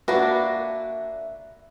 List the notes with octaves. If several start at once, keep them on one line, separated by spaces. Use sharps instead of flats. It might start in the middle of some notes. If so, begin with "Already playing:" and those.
A#3 D4 F#4 B4 E5